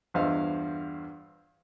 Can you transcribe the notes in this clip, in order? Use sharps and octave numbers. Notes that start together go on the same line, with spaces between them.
E2 G2 F4 C5 D#5 F5